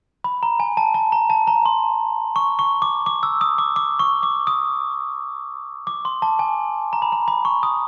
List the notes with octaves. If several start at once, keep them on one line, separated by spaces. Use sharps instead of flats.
B5
A#5
G#5
A5
A5
A#5
A5
A#5
C6
C#6
C#6
D6
D6
E6
D#6
D6
D6
C#6
D6
D#6
D6
C6
A5
G#5
A#5
B5
A#5
B5
C#6
D#6